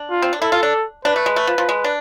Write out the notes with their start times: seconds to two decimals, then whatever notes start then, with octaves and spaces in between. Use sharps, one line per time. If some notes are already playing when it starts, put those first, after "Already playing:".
Already playing: D4
0.10 F4
0.22 C4
0.33 D4
0.41 E4 A4
0.52 F4
0.63 D4
1.05 D4 B4
1.16 A3
1.26 G#3
1.36 A3
1.47 F3
1.58 F3
1.69 G#3
1.84 D4